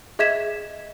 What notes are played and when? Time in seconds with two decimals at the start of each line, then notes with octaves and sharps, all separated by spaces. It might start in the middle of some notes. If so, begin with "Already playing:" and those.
0.19 G#4 D#5 E5 G#6 B6 E7